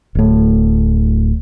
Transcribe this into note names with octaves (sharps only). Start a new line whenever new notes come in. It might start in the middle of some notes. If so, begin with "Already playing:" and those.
D1 A2